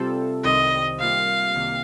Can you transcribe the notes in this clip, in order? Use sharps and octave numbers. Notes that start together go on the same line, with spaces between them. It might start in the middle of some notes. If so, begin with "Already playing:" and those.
Already playing: C3 G3 C4 F4 A4
C2 C3 D#3 G3 C4 D#5
C3 G3 A#3 F4 F5
C2 C3 D#3 A#3